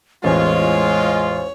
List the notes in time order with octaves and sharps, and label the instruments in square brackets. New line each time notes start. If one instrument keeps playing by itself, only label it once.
[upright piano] A1 E2 [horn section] G#3 F4 [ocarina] C5 [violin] C#5